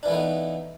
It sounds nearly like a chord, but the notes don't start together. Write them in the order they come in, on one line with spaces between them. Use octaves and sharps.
D4 E3 A3 B3 D#4